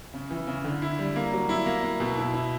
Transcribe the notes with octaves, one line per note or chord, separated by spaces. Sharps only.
C#3
E3
C#3
D3
E4
G3
A#3
F#3
E4
A#3
A#3
B2
E4
E4